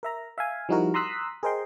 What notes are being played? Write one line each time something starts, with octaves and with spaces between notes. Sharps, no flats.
A#4 E5 A#5
E5 F5 G#5
F3 G3 D#4 E4 F#4 A#4
A#5 C6 D#6 E6 F#6 B6
G#4 A#4 C5 D#5 G5 C6